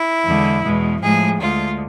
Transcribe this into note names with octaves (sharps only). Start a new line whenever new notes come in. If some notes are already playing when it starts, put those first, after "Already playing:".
Already playing: E4
E2 D3 G#3
E2 B2 G#3
A2 F3 G#3 G#4
D2 D3 G#3 F4